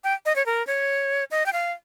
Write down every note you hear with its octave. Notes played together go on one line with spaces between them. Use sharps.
G5
D#5
C#5
A#4
C#5
D#5
G5
F5